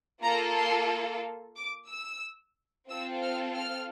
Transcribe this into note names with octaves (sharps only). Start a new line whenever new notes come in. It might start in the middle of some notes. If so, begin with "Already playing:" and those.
A#3 F4 A4 A#5
C6
D6
E6
C4 F4 A4 E6
F6
F6